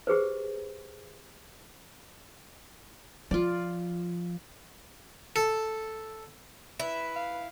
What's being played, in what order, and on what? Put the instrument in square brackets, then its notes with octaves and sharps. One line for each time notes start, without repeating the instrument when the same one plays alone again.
[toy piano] G4 G#4 B4 C5
[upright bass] F3 [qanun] F4 D5
[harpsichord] A4
[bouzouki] E4 [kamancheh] B4
[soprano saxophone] F5